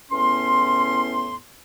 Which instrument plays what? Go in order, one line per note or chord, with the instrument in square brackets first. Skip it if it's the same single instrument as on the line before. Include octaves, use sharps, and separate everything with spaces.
[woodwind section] E2 A2 B3 C#4 C6